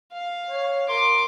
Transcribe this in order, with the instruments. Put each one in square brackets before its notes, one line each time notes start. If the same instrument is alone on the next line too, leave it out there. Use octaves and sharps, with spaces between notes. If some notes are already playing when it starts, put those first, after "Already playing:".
[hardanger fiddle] F5
[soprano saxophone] C#5
[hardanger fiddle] A#4 D6 [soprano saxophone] C6